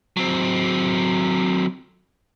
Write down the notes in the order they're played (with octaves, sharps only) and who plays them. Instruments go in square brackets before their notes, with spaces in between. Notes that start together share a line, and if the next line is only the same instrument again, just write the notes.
[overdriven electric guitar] F#3 C4